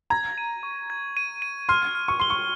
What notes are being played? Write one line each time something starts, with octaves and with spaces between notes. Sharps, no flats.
A#5 G#6
D#7
C#6
G#6
D#7
D#7
C6 F6
F6
C#6
C6 G7
C#6